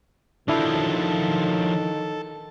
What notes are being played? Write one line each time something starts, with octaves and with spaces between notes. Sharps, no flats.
D#3 F3 F#3 D4 E4 A4